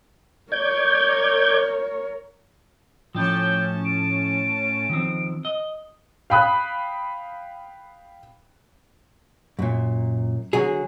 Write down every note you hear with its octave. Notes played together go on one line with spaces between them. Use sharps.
A#4 C#5 D5 G6 G#6
A2 F3 C#4 D5 G5 A5
D7
D#3 F3 C4
D#5
F5 G5 B5 D#6 F#6
F#2 A#2
D3 F#3 G#4